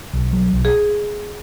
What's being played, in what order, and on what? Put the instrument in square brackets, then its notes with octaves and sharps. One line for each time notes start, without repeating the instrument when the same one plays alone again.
[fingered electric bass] B1
F#3
B1
[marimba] G#4